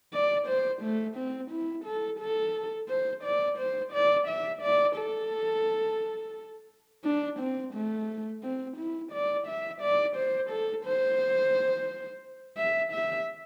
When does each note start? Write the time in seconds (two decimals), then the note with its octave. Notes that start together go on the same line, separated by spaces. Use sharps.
0.13 D5
0.47 C5
0.83 A3
1.16 C4
1.51 E4
1.85 A4
2.20 A4
2.89 C5
3.24 D5
3.58 C5
3.93 D5
4.27 E5
4.62 D5
4.97 A4
7.04 D4
7.40 C4
7.74 A3
8.43 C4
8.78 E4
9.12 D5
9.47 E5
9.82 D5
10.16 C5
10.50 A4
10.85 C5
12.57 E5
12.93 E5